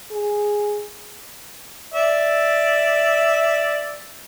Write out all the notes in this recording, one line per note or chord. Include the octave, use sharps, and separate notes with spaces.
G#4
D5 E5